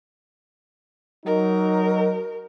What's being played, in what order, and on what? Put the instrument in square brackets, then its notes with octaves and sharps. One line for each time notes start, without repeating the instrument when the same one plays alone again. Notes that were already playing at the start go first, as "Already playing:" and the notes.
[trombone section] F#3 D#4 [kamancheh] A#4